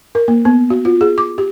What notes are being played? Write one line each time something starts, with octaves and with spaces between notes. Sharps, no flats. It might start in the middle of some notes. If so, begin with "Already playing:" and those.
A#4
A#3
B3
F#4
F4
G#4
D6
G4